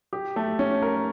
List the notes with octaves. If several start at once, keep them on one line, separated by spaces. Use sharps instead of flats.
G4
A3
C#4
A#4